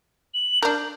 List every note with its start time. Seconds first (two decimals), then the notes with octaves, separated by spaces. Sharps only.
0.34 F#7
0.62 D4 A#4 G6